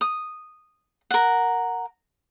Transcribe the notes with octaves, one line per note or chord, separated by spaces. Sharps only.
D#6
A#4 F#5